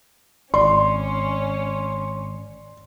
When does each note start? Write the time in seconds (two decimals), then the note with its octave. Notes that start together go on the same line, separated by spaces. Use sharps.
0.54 G#1 C#4 D5 C6